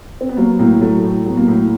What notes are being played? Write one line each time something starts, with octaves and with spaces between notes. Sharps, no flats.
C4
B3
F#3 A#3
A2 A#3
F#3 A3
A2
F#3 B3
A#3
A2